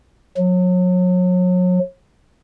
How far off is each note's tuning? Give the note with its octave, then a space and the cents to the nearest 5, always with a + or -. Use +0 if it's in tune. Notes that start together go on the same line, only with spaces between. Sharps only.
F#3 -35